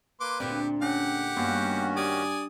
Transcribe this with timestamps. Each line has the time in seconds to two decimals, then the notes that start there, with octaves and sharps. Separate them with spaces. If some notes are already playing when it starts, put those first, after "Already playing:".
0.20 A#3 B4 C6 D6
0.40 D2 A#2 C4 D4 G4
0.82 C4 C#4 G4 C#5 F#5
1.37 G2 D#3 A#3 B3 C#4 F#4
1.97 G4 D5 G#5 D#6